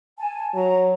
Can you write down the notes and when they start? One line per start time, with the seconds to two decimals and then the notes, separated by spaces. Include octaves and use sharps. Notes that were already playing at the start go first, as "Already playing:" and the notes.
0.18 G#5 A5
0.55 F#3 A#5